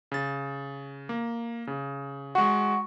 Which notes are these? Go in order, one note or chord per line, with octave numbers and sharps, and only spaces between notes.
C#3 A6
A#3
C#3
G#3 F#4 F#5 C#6